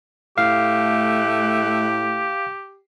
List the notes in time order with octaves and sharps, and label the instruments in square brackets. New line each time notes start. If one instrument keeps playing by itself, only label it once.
[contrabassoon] A2 [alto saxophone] A3 [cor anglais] G4 [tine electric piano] F5